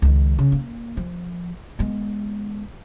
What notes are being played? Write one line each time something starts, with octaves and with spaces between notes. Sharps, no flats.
C#2 D#3
C#3
A#3
F3
G#3 B3